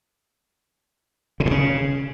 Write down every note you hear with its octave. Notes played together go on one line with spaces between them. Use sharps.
C#3
A2
C#3